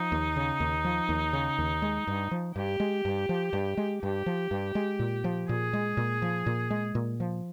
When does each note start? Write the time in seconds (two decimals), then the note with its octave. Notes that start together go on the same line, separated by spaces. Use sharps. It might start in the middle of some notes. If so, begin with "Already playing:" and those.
Already playing: F3 D#4
0.12 D#2
0.36 C#3
0.60 D#2
0.85 F3
1.09 D#2
1.33 C#3
1.58 D#2
1.82 G#3
2.07 G2
2.31 F3
2.56 G2 G4
2.80 G#3
3.05 G2
3.29 F3
3.53 G2
3.77 G#3
4.03 G2 G4
4.26 F3
4.51 G2
4.75 G#3
4.99 A#2
5.24 F3
5.49 A#2 G#4
5.73 G#3
5.97 A#2
6.22 F3
6.46 A#2
6.70 G#3
6.95 A#2
7.20 F3